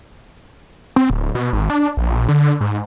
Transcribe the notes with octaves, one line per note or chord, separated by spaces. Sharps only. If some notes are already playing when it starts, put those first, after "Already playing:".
C4
D1
B2
G#1
D4
A#1
D3
G#2